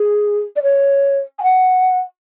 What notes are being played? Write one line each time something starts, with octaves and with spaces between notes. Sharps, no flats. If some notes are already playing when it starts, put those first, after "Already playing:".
Already playing: G#4
D5
C#5
G#5
F#5